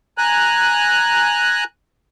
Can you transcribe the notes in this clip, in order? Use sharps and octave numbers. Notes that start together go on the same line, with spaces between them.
G#5 A#5 F#6